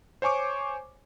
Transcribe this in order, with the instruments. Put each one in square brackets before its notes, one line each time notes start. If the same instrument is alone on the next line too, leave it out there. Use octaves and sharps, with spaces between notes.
[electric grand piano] C5 C#5 G#5 C#6 D6